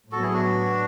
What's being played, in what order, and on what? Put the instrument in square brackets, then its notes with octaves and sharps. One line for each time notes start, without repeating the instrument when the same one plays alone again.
[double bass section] A2 F#3 B3 [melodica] F#4 A4
[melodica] E4 G#4
D4 F#4